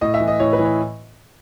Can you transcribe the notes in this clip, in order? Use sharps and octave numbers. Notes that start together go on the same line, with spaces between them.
A2 D#5
E5
E3
D#5
A2 C#5
B4
E3
C#5